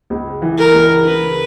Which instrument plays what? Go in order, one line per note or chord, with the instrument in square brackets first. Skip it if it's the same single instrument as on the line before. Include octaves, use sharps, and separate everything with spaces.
[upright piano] C#2
E3
[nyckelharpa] A#4
[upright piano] C#2
[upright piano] C#3 [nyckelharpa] B4